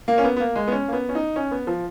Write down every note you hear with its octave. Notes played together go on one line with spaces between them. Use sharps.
A#3
C#4
B3
B3
A#3
G#3
B3
C#4
A#3
B3
C#4
D#4
C#4
B3
F3